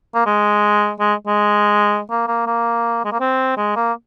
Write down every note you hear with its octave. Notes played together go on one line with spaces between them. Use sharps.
A#3
G#3
G#3
G#3
A#3
A#3
A#3
G#3
A#3
C4
G#3
A#3